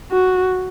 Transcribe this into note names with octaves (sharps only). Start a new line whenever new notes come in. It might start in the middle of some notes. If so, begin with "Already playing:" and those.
F#4